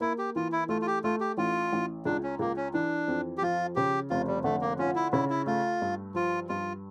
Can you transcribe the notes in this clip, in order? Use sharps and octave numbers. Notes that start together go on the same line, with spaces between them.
A#3 E4
G4
E3 F4
E4
A3 F4
F4
G4
A3 F4
G4
A1 F4
A1
C#2 D4
C#4
C#2 A#3
C#4
E3 D4
F2
G4
F3 F4
C#3 G4
F1 F4
G3
D3 A3
A#3
C#4 F4
E4
C#3 E4
E4
A3 F4
G2
F3 F4
G2 F4